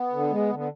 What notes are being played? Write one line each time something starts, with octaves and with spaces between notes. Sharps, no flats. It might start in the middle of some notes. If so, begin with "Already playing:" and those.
Already playing: B3
D3
G#3
D3
B3